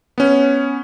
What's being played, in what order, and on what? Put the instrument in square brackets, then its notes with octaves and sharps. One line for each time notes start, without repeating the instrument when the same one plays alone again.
[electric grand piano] B3 C#4